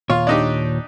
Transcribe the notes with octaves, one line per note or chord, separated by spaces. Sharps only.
D#2 A#2 F4 C#5
D4 D#4 G4